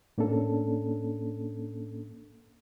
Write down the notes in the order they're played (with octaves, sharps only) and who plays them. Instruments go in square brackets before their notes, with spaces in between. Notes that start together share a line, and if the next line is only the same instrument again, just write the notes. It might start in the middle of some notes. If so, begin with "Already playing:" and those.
[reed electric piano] A2 A#3 C#4 D4 A4